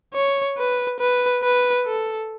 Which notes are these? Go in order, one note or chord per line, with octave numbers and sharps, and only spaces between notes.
C#5
B4
B4
B4
A4